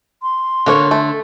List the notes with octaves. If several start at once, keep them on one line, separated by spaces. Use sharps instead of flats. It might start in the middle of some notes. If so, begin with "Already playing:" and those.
C6
D3 F#3 A#3 C#5
A3